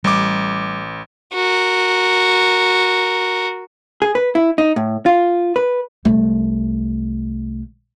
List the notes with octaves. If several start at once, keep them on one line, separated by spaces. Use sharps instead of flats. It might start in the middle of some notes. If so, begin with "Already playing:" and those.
A1 G3 D6
F#4 A#4
G#4
B4
E4
D#4
A2
F4
B4
C2 A3